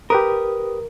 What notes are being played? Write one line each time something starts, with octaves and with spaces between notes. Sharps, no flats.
G4 A#4 B4 D#6